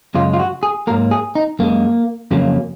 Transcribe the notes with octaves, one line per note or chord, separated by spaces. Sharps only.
F#2 C#3 G#3 F4
F4
F#4
G#4
G#2 F#3 A#3 A#4
G#4
D#4
F#2 F3 G#3 A#3
F2 C#3 F#3 A#3